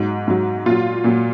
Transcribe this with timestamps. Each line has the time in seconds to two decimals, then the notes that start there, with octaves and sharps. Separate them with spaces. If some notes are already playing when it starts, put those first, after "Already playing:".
Already playing: G#2 F#3
0.27 G#2 F#3
0.66 A#2 F#3 F4
1.04 A#2 F#3